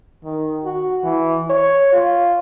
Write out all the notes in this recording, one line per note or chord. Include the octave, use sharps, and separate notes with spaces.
D#3
F#4
E3
C#5
F4